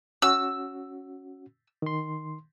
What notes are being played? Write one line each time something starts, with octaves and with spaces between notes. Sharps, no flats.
C#4 F#4 E6
D#3 C6